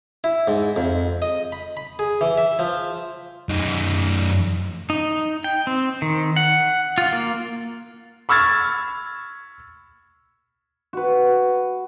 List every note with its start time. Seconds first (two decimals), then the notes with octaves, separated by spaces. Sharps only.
0.24 E4
0.48 G#2
0.76 F2
1.22 D#5
1.52 B5
1.77 B5
1.99 G#4
2.21 E3
2.38 E5
2.59 F3
3.49 F#2 D#4
4.90 D#4
5.44 G5
5.67 C4
6.02 D#3
6.36 F#5
6.98 F4
7.12 A#3
8.29 B5 C#6 E6 F6 G#6 A6
10.93 F#4 B4